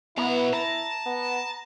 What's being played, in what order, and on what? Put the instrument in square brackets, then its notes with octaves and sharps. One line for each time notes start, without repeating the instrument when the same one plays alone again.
[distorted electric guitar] B2 A#5 [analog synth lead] B3 [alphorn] E4
[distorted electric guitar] A5 [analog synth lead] A#5
[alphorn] B3